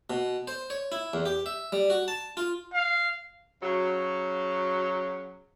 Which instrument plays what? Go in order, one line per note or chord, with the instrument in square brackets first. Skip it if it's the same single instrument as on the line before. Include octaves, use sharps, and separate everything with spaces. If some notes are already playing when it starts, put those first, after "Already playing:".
[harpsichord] B2
C5
C#5
E4
E2
G4
E5
G3
F#4
A5
F4
[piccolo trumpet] F5
[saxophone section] C#3 F#3